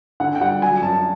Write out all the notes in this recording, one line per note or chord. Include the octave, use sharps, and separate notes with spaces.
D3 F#5
G5
G3 F#5
F#3 G#5
F#2 A5